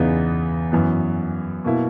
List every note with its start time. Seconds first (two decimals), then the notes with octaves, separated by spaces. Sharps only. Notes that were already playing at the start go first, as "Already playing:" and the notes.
Already playing: E2 C#3 E3 B3 D#4
0.72 F#2 E3 B3
1.64 B2 A#3 E4